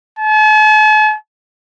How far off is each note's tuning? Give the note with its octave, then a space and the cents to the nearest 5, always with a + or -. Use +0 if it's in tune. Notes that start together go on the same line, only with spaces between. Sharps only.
A5 -45